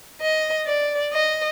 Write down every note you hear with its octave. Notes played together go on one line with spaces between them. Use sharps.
D#5
D5
D#5